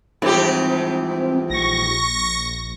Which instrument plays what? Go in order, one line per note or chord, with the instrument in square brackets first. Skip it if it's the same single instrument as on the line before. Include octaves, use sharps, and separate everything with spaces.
[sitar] G#2 G4 [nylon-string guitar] E3 F3 G3 [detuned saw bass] C4
[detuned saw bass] A#1 [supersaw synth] C#6 A#6